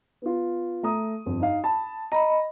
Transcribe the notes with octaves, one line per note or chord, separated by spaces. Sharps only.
B3 F4
A3 A#5 D#6
G1 F2
D#4 D#5 F5
A5 B5
D#5 A#5 B5